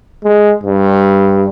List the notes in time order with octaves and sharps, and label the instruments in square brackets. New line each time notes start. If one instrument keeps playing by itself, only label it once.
[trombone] G#3
G2